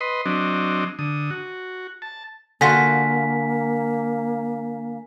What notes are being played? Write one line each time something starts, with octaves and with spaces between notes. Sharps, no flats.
B4 D#5 C6
F#3 C4 D4 D#5
D3 D#6
F#4
A5
D3 A#3 F4 F#4 G#5 B6